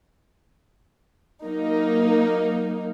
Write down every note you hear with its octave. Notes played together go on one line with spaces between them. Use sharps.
F#3 A#3 D#4